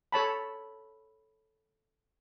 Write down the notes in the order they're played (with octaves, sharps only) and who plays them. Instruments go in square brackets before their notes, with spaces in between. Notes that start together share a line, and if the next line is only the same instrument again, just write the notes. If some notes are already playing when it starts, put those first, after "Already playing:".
[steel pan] A4 C#5 A5 B5